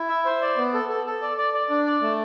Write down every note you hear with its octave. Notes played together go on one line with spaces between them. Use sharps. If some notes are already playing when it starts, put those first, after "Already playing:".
Already playing: E4
E5
C5
D5
B3
A4
A4
A4
D5
D5
D5
D4
D5
A3